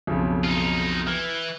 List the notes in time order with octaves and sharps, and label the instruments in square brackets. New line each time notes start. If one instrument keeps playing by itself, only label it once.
[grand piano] B1 F2 C#3
[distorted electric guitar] D#4 F4
[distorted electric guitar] E3 [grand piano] F6